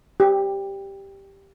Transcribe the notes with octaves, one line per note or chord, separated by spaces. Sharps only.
G4